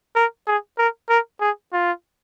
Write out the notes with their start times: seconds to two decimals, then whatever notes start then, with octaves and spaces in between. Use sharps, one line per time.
0.16 A#4
0.47 G#4
0.78 A#4
1.09 A#4
1.41 G#4
1.73 F4